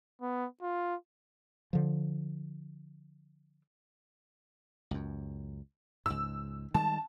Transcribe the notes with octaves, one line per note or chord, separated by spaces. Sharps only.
B3
F4
D3 F3
C#2 F#2
C#2 G#2 E6
D#3 G3 G#3 A5